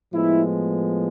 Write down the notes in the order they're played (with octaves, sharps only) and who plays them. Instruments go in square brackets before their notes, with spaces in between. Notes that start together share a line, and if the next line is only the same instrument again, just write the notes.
[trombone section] A2 F3 G#3 B3 E4